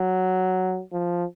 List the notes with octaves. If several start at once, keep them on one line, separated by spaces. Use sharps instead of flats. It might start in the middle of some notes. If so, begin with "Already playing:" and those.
Already playing: F#3
F3